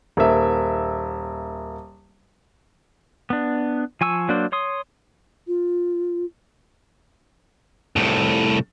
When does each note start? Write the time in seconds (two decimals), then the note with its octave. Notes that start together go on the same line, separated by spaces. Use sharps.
0.17 D#1 A#3 E5
3.30 B3 D4
4.01 F3 G#5 C#6 E6
4.29 F#3 A#3 D4 C5
4.52 C#5 C6 D#6
5.47 F4
7.96 C2 A2